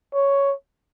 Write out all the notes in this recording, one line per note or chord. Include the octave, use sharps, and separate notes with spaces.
C#5